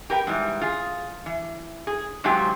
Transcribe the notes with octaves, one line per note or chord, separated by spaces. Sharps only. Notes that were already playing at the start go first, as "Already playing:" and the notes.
G4 A#4 B4 G5
G#2 E3 G3
F4 G#4
E3
G#4
G#2 C3 F#3 F4 G4 G#5